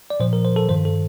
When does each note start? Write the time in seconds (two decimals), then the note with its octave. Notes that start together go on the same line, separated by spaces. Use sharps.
0.10 D5
0.20 A#2 F3 C5
0.33 A#4
0.45 C5
0.56 A4
0.69 G2 D#3 C5
0.85 A4